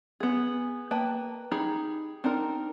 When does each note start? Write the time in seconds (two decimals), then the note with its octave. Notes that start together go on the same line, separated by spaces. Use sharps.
0.20 B3 G#4
0.91 A#3 B4 G5 A5
1.51 D#4 G4 G#4 B5
2.24 C4 D4 D#4 A#4